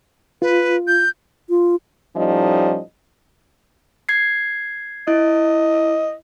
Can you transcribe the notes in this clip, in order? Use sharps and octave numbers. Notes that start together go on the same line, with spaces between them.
F4 B4
G6
F4
A2 F3 G3 C#4 D#4 D#5
G#6 C7
E4 D#5